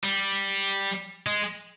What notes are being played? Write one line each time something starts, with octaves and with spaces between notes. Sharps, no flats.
G3
G#3